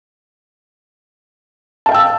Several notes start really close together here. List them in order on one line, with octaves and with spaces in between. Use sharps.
A5 F5 G5 E6